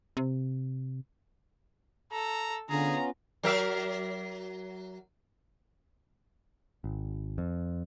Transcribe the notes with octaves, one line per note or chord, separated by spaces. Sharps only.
C3
A4 A#5
D3 B3 C#4 F4 G#4 A#5
F#3 A#4 E5
G#1
F2